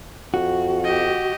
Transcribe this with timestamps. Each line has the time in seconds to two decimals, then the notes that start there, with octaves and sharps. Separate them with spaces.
0.34 F2 F#4
0.84 G4 D#5